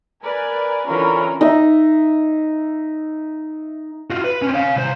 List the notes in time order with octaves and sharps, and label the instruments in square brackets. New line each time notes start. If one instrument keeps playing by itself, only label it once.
[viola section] A#4 B4 D5 G#5
D3 E3 C#4 F4 A#4 B5
[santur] D#4 E5
[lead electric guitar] F4 F#4
B4
C4 C#4
C#5 F5
C2 C5